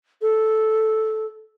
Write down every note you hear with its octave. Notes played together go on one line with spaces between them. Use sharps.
A4